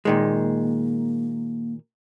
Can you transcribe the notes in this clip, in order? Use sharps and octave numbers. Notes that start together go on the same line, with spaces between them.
A#2 D#3 G#3 A#3